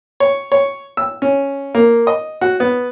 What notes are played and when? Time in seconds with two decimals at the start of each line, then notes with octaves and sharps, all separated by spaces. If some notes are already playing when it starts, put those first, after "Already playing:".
0.20 C#5
0.52 C#5
0.97 E6
1.22 C#4
1.75 A#3
2.07 D#5
2.41 F#4
2.60 B3